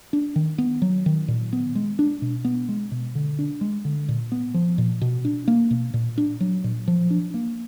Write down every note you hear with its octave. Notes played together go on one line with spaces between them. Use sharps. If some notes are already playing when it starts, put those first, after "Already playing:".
D4
D#3
B3
F#3
D#3
A#2
B3
G#3
D4
B2
B3
G#3
B2
D3
D4
G#3
D3
A#2
B3
F3
A#2
B2
D4
A#3
B2
A#2
D4
F#3
A#2
F3
D4
A#3